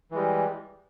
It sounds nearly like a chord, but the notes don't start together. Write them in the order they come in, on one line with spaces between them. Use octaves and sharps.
E3 G#3 G3